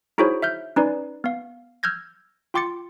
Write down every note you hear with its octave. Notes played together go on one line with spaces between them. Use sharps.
D#4 E4 F#4 G#4 C5 C#5
E5 F6 G6
C#4 D#4 B4 D5
B3 F5
E6 F6 G6 G#6 A#6
F4 G5 C6 D6 A6 C#7